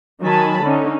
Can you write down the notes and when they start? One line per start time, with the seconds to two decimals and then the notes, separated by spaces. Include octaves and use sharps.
0.22 D#3 F#3 G#5 A5 B5
0.62 D3 C#4 D#4